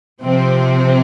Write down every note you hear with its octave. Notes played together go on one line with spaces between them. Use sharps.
C3 F3 C4